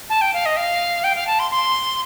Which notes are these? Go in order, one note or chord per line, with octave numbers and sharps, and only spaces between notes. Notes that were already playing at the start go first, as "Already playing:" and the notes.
A5
G5
F5
D#5
F5
G5
F5
A5
C6
C6